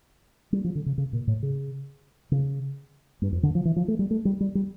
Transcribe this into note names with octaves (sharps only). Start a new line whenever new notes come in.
G3
F3
D3
C#3
C#3
A#2
A2
C#3
C#3
G2
F2
D3
F3
E3
F3
A3
G3
A3
G3
G3
G3